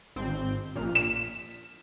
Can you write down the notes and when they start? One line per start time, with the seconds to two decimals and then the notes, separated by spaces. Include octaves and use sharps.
0.16 G#1 C4 G6
0.75 A#1 A#2 F6
0.95 E7
1.10 B6